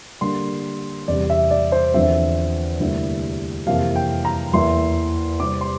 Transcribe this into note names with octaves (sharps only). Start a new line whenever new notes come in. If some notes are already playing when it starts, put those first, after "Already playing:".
D3 G3 A#3 C6
E2 C3 G3 D5
E5
D5
C5
E2 D3 F3 C4 E5
D2 C3 G3 A#3 E4
F2 C3 E3 A#3 F4 F5
G5
A#5
E2 E3 A#3 E4 C6
C3 G3 C4 D6
C6